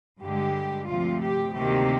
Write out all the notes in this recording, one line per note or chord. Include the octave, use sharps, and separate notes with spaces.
G2 D3 G#3 G4
D2 C3 F3 F4
G4
D2 C3 D#3 A#3 G4